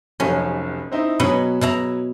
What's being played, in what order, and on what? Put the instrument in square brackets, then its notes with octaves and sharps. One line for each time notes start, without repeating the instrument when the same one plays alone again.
[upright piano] F1 B1 [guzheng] C#4
[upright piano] C4 D#4 E4
[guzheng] B2 D#5 F#5 [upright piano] F#3 C#4 B5
[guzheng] B2 E4 A#5